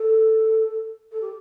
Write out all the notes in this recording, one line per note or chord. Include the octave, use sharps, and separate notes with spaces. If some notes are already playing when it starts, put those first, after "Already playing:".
Already playing: A4
A4
G4